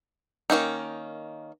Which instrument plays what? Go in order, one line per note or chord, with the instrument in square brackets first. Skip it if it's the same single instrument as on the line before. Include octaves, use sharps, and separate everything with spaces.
[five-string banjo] D#3 A#3 C#4 D#4